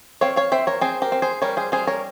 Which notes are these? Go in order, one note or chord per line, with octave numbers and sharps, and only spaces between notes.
C4 C#5 F5
C#5 F5
C4 C5 E5
A#4 C#5
C4 G#4 C5
G4 A#4
C4
G#4 C5
G3 A#4 C#5
G#4 C5
G3 G#4 C5
A#4 C#5